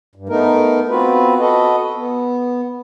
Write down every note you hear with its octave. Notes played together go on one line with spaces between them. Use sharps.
G2
A3 B3 D#4 A#4
B3 C4 F4 F#4 B4
F#4 A4 B4 D#5
B3